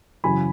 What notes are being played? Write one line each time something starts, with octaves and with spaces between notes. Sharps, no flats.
F#2 C#3 E3 G#5 B5